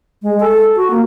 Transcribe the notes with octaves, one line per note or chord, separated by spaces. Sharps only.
G#3
A4
F#4
A#3